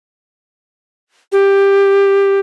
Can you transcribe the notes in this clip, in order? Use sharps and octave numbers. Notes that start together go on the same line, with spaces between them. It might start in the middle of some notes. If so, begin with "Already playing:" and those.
G4